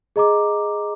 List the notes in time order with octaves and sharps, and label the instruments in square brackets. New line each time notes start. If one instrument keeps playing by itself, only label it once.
[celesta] G#4 D#5 A#5 D6